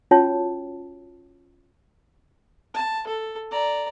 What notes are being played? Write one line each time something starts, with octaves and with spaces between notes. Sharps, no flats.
C#4 F4 F#4 C#5 G5 A5
A5
A4
D5 A#5